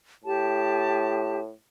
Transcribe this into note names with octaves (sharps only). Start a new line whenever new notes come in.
A2 G4 A5